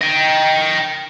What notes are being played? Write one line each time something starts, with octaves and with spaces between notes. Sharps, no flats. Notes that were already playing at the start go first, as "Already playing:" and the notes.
D#5 G5